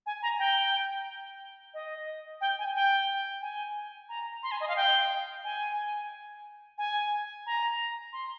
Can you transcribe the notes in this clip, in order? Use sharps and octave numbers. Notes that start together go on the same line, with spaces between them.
G#5
A#5
G5
D#5
G5
G#5
G5
G#5
A#5
C6
G#5
D#5
F5
G5
G#5
G#5
A#5
C6